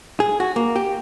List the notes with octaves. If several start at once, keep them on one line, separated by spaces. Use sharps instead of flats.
G#4
F#4
A#3
G4